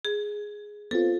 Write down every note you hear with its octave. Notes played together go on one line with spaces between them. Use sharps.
G#4
B3 C4 F4 A4